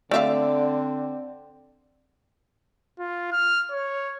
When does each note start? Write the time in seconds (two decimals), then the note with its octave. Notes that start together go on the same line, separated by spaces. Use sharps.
0.11 D3 A3 C4 D5 E5 F5
2.99 F4
3.32 F6
3.71 C#5